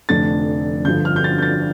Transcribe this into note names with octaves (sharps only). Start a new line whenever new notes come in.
F1 F2 D3 A3 D4 A6
G1 G2 D3 F3 G6
F6
G6
A6
G6
A6